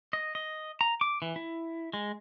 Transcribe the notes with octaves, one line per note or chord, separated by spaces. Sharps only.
D#5
D#5
A#5
D6
E3
E4
G#3